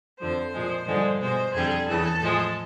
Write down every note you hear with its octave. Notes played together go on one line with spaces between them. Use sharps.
F2 D3 F3 C5
A#2 F3 G#3
G2 D3 F3 G#3
B2 G#3 C5
F2 D3 G3 G#4
E2 C#3 E3 A4
A2 F3 G#3